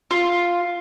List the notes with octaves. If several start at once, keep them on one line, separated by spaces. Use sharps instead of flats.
F4